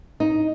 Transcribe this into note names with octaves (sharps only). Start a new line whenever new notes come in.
D#4